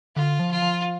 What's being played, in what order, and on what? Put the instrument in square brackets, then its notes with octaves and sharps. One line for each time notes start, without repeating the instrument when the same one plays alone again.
[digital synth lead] D3 [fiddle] F4
[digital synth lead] F3
[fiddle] F4
[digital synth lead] F3